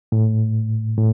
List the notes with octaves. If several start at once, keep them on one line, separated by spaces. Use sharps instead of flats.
A2
A2